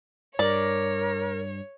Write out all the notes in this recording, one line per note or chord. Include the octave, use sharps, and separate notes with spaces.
G2 A#4 C#5 D5